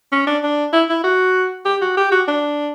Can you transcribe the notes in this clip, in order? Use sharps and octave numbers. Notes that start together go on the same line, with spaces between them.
C#4
D4
D4
E4
E4
F#4
G4
F#4
G4
F#4
D4